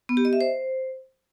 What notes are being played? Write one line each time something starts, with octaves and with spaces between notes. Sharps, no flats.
B3
G4
D#5
E5
C5